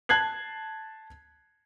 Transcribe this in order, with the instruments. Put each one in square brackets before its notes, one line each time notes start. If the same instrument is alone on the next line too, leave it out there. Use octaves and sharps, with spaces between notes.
[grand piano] A5 F#6 G#6 C7 F#7